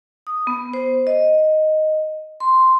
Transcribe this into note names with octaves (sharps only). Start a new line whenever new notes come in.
D#6
B3
C5
D#5
C6